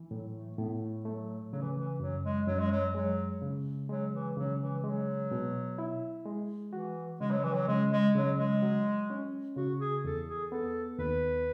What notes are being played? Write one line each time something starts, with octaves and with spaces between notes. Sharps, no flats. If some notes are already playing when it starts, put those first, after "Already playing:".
Already playing: E3
A2 F#3
A3
A2 B3
A3
F#3 A3
C#3 F#3
E3
E3
F#2 F#3
G#3
F#2 F#3
G#3
F#3
F#3 G#3
C#3
F#3 G#3
E3
C#3 F#3
E3
F#3 G#3
B2
E4
G#3
E3 F#4
C#3 G#3
F#3
E3
F#3
C#3 G#3
G#3
C#3 F#3
G#3
F#3
C#4
C#3 F#4
G#4
E2 A4
G#4
B3 A4
D#2 B4